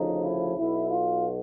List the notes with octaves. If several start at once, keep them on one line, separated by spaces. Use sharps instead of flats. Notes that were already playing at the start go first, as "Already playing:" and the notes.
Already playing: D2 C#3 F3 D#4
E4
B1 B2 E4
F4